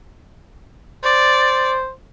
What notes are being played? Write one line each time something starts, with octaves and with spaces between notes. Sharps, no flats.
C5 D5